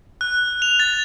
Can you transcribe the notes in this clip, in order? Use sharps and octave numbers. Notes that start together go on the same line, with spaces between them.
F#6
F7
A6